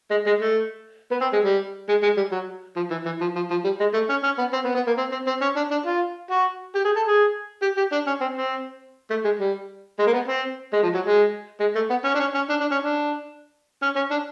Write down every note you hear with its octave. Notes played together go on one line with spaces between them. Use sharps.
G#3
G#3
A3
B3
C4
G#3
G3
G#3
G#3
G3
F#3
F3
E3
E3
F3
F3
F3
G3
G#3
A3
C#4
C#4
B3
C4
B3
B3
A#3
C4
C4
C4
C#4
D4
D4
F4
F#4
G4
G#4
A4
G#4
G4
G4
D4
C#4
C4
C4
A3
G#3
G3
G#3
A#3
B3
C4
G#3
F3
F#3
G#3
G#3
A3
B3
C#4
D4
C#4
C#4
D4
D4
C#4
D4
C#4
C#4
D4